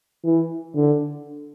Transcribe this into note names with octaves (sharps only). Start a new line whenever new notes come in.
E3
D3